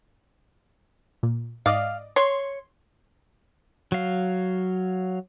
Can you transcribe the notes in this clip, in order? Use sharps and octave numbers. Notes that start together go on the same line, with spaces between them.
A#2
G#2 D5 D#5 F5
C#5 C6
F#3 F5